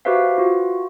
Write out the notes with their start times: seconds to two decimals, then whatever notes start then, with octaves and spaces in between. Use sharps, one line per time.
0.05 F#4 G4 B4 C5 E5 F5
0.38 F4 F#4